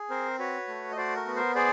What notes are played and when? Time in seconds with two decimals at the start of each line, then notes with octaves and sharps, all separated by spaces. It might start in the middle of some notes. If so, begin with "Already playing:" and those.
Already playing: G#4
0.10 C4 A#4 C5
0.38 F#4 B4 C#5
0.68 A3
0.92 D#5
0.96 F#4 C5 D5
1.16 A#4
1.26 B3
1.36 A#4 C5
1.55 G#4 C5 D5